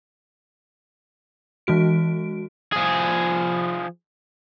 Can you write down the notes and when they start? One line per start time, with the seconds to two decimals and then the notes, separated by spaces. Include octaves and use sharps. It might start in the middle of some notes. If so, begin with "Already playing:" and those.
1.67 E3 G#3 F#4 D7
2.73 F3 G#4